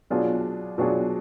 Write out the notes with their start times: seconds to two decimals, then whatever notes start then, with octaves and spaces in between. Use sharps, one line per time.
0.10 B2 F#3 D4 F4 G#4
0.78 B2 F#3 D4 F4 G#4